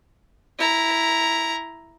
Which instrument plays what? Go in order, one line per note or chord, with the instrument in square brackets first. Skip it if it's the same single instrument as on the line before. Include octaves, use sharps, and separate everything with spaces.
[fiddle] E4 A#5